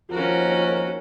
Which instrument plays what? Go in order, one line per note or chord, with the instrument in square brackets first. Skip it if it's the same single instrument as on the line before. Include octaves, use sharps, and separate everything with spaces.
[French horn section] D#2 F3 [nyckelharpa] C#4 F#4 [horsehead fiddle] A#4